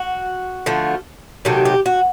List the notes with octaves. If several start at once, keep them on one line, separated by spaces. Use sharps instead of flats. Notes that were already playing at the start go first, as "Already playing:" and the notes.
Already playing: F#4
D3 F3 A3
C3 D#3 F#3 A3 G4
G4
F#4